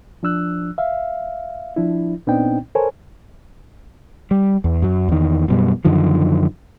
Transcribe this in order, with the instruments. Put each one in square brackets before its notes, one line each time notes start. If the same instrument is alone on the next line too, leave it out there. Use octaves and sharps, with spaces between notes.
[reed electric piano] F3 D4 E6 F#6
E5 F5
F3 D4 E4
A#2 B3 C4 D4 D#4 G5
A4 A#4 C5 C#5 G#5
[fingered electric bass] G3
E2
F#2 F#3
E2 D#3
F#2 B2 G3
F#2 D3 D#3 F3